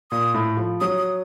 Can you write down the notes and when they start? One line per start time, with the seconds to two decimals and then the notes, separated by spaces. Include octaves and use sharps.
0.11 A#2 D#6
0.34 A2
0.57 F3
0.80 F#3 D#6
0.98 D#6